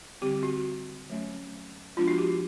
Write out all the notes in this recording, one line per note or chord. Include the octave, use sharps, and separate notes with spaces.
D3 G3 C4 G4
F#4
F#3 A3 C#4
F3 G#3 B3 D4 F4
F#4
G4